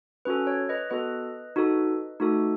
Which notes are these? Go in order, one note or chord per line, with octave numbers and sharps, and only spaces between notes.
C#4 F#4 A4 B4
C#5
B4 D#5
B3 F#4 A4 B4 D#5
D#4 F#4 A4
A3 D#4 F#4 A4